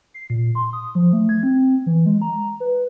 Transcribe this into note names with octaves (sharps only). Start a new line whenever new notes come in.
C7
A#2
C6
D#6
F3
A3
G#6
C4
E3
G#3
A#5
B4